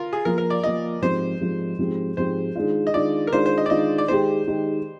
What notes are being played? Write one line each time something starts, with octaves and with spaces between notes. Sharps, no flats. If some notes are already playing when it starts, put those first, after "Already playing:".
Already playing: F4 A#4
G#4
F3 A#3 F4 A#4
A#4
D5
F3 A#3 F4 D#5
G#2 F3 G#3 C4 G4 C5
G#2 F3 G#3 C4 G4
G#2 F3 G#3 C4 G4
G#2 F3 G#3 C4 G4 C5
D#3 G#3 D4 F4
D#5
D#3 G#3 D4 F4 D5
A#4
D#3 G#3 D4 F4 C5
C5
D#5
D5
D#3 G#3 D4 F4 D#5
D5
D#3 G#3 D#4 G4 C5
D#3 G#3 D#4 G4